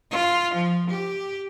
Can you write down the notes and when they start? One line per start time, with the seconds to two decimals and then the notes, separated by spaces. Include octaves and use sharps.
0.11 F4
0.54 F3
0.90 G4